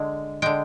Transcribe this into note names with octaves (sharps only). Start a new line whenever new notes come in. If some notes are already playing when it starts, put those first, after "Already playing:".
Already playing: D3 G#3
D3 G#3 G5